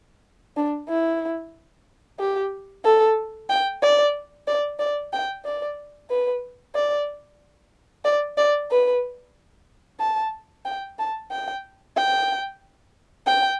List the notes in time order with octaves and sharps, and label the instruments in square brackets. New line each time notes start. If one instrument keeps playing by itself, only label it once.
[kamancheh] D4
E4
G4
A4
G5
D5
D5
D5
G5
D5
B4
D5
D5
D5
B4
A5
G5
A5
G5
G5
G5